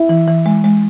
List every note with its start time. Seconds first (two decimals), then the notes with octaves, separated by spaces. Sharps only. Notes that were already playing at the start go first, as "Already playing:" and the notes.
Already playing: E4
0.09 E3
0.27 E3
0.46 G#3
0.64 G#3